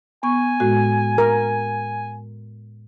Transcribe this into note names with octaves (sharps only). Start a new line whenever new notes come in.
B3 G#5 C#6
A2 G#3 F#4
A#4